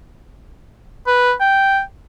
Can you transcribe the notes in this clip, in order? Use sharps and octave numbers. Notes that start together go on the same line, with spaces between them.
B4
G5